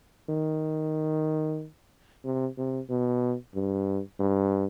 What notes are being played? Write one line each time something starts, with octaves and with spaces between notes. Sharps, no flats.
D#3
C3
C3
B2
G2
G2